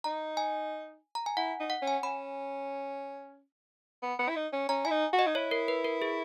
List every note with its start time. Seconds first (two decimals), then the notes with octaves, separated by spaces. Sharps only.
0.04 D#4 A#5
0.37 G#5
1.15 A#5
1.26 G#5
1.37 E4 F#5
1.60 D#4
1.70 F#5
1.82 C#4
1.87 G#5
2.03 C#4 B5
4.02 B3
4.19 B3
4.29 E4
4.36 D#4
4.52 C#4
4.69 C#4 A#5
4.85 E4 G#5
4.90 D#4
5.13 F#4
5.19 D#5
5.27 D#4
5.35 E4 C#5
5.51 A#4
5.68 B4
5.85 A#4
6.02 G#4